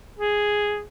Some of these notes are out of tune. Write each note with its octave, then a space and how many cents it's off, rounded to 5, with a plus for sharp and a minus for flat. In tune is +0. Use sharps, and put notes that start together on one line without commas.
G#4 +0